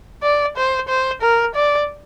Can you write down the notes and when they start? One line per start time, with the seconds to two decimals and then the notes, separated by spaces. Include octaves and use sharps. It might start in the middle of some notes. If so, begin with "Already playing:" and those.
0.23 D5
0.57 C5
0.89 C5
1.22 A#4
1.55 D5